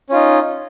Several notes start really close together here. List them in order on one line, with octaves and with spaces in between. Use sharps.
C#4 F4 D#4